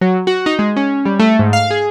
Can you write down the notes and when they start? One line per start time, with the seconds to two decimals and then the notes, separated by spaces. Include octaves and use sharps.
0.01 F#3
0.27 F#4
0.46 D#4
0.59 G#3
0.76 C#4
1.05 G3
1.19 A3
1.39 G#2
1.53 F5
1.71 G#4